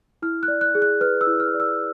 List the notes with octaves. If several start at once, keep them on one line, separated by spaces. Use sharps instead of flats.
E4 F6
F#6
D5
F#6
G#4
F#6
B4 F6
E6
E4
F6
D5
E6